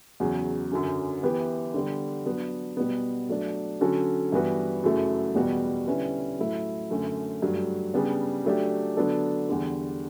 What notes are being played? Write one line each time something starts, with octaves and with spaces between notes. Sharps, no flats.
E2 C#3 F#3
F#2 D3 F#3 C#4
E3 B3 E4 G4 B4
D3 G3 B3
F#3 B3 D4
B2 G3 B3
F#3 A3 D4
D3 F#3 C#4 F#4 A4
G2 E3 B3 F#4 B4
F#2 C#3 F#3 A3 E4
E2 B2 G3 B3 F#4
D3 G3 C#4 E4 B4
A2 F#3 A3 E4
F#2 D3 A3 C#4 F#4
G2 F#3 A3
C#3 G3 B3 D4
F#3 A3 D4 G4
D3 F#3 B3 D4 A4
E2 D3 G3